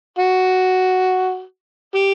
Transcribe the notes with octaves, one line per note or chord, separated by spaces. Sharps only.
F#4
G4